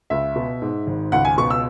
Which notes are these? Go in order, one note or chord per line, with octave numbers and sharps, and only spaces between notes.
C#2 E5
B2
G#2
G#1
C#2 F#5
G#5
B2 C#6
E6